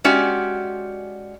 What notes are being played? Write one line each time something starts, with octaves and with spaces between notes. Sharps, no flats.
G#3 C#4 F#4 G4 D5 E5